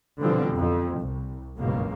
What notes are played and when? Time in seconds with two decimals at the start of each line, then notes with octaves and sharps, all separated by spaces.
0.19 B2 D3 E3 F3 G3 C4
0.54 F2
0.99 C2
1.57 F#1 C#2 G2 B2 A#3